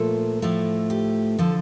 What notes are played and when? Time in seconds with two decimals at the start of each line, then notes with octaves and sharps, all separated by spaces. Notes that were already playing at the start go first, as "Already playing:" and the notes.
Already playing: A#2 F3 A3 A4
0.42 A2 F3 A3
0.90 G4
1.39 D3 F3 A4